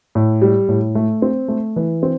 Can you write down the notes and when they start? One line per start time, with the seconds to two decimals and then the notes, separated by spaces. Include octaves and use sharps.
0.15 A2
0.42 G3
0.69 A2
0.95 A3
1.22 C4
1.48 A3
1.76 E3
2.03 C4